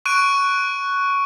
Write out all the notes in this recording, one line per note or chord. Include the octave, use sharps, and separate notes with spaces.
C#6 F#6 D7 D#7